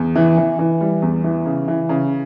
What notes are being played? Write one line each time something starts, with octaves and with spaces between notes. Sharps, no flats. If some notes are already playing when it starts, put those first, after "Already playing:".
Already playing: E2
E3
E3
E3
G3
E2
E3
C#3
E3
C#3